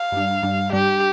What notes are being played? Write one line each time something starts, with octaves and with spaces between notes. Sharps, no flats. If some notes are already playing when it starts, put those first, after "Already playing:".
Already playing: F5
G2 G3 D4
G2 G3 D4
G2 G3 D4 G4